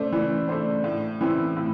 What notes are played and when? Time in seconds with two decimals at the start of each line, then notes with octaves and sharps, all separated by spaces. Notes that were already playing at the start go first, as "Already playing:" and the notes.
Already playing: A3 D4 C5
0.12 E3
0.48 A3 D4 C5
0.84 A2
1.21 E3 C4 E4
1.57 A2